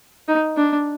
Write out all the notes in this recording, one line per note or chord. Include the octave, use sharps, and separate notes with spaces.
D#4
D4